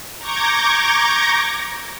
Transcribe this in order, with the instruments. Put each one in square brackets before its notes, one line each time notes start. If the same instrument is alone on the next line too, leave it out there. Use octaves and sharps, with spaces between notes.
[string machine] A#5 C#6 D6 G6 G#6 A#6